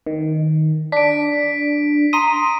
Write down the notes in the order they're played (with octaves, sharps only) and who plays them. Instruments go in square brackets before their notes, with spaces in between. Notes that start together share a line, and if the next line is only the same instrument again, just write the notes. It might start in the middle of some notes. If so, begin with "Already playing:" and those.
[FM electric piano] D#3
[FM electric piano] D4 [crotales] B6 D7
[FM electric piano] A#5 C6 D#6 [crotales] D#7